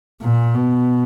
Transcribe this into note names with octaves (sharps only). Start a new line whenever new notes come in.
A#2
B2